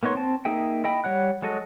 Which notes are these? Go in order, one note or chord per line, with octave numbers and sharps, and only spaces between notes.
A#3 B3 D#4 C#5 C6
C4 A5
A#3 D#4 G#4 E5 G5
E4 D#5 G5 B5
G3 C#5 F#5 F#6
F#3 G#3 F#4 A4 D#5